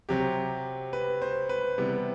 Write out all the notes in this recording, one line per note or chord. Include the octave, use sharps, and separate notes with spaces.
C3 F#3 C4 G4
B4
C5
B4
C3 E3 G3 B3